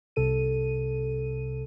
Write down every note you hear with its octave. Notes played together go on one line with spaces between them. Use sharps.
C2 C3 A4 D#7